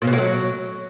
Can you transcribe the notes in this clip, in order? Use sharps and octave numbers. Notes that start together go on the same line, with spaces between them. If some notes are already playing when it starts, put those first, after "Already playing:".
A#2
B2
A2
F#3